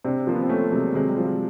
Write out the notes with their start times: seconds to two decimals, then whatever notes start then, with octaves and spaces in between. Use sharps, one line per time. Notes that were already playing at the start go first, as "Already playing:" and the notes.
0.05 C3 C4 D4
0.27 F3 A#3
0.35 B3
0.43 C4
0.49 A3 B3 C#4
0.72 C3 F#3 G#3
0.94 C3 F#3 G#3
1.09 G3
1.17 F3
1.25 G3